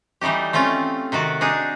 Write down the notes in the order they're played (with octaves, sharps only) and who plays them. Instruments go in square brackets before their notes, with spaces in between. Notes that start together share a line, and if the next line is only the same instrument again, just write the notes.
[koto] E3 G3 A3 D#4 G4
A3 C4 C#4 F4
C3 D#3 F#4 A5
D4 D#4 G#4